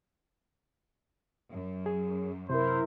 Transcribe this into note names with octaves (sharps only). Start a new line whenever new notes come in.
F#2
G#4
C3 E4 A#4 C5